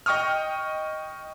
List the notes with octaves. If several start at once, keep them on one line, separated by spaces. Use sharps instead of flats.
D#5 G5 C#6 D#6 F6